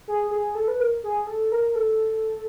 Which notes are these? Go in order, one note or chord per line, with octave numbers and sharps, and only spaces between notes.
G#4
G#4
A4
B4
A#4
G#4
A4
A#4
A4